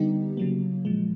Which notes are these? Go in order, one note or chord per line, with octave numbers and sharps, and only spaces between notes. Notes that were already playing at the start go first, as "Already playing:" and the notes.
Already playing: D3 G3 B3 D#4 G4
C#3 F#3 A#3
A#2 F3 G#3